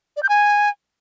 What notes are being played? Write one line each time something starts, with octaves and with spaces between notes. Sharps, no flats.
D5
G6
G#5